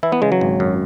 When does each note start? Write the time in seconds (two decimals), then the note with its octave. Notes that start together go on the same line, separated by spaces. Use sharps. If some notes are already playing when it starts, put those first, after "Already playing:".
0.03 E3 E4
0.12 B3
0.22 C#3 G#3
0.32 F#3
0.41 G#1
0.60 F#2